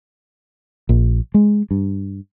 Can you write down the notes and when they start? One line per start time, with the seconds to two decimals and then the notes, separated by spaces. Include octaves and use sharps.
0.89 A#1
1.34 G#3
1.71 G2